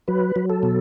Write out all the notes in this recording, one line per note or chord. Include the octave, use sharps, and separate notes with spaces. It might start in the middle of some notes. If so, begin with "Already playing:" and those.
F#3 B4
F#3
A4
B2